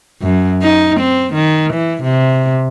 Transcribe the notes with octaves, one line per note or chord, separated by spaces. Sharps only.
F#2
D#4
C4
D#3
E3
C3